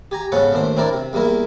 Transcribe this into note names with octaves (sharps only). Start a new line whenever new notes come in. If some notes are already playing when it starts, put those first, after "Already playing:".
G4 G#5 A#5
G#2 C#3 B3 C#4 A4 F#5
D#2 A2 D4 C5
C4 D4 E4 A#4 D5
C3
E2 G3 A#3 E4 A#4